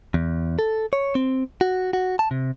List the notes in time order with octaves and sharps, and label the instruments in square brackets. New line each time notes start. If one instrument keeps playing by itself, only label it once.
[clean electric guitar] E2
A4
C#5
C4
F#4
F#4
A5
C3